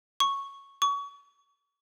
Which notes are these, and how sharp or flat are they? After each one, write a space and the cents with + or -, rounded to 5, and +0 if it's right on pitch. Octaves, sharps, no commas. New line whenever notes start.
C#6 -5
C#6 +30